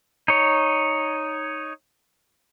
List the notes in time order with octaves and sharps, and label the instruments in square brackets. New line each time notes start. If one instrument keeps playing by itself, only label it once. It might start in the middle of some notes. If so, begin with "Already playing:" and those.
[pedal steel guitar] D#4 C#5